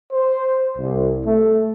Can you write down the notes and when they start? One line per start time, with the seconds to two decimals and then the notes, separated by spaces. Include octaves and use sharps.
0.13 C5
0.77 C2
1.24 A3